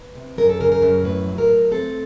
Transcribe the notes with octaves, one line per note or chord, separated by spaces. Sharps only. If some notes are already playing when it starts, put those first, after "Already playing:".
Already playing: B4
C3
F#2 A#4
A4
C#3 A#4
A#4
F#2
A2 B4
F#3
A#4
A2
C4 A4